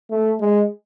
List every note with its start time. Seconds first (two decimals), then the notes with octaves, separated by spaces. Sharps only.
0.11 A3
0.40 G#3